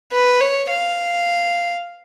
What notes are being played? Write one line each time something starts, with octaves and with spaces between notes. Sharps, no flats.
B4
C#5
F5